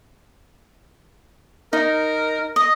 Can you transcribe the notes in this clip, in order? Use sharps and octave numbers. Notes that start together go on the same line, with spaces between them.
D#4 A#4
D#5